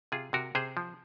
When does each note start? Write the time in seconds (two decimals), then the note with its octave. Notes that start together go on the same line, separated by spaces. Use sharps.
0.12 C3 F4 G#4
0.33 C3 F#4 A#4
0.55 C3 G#4 C5
0.77 F3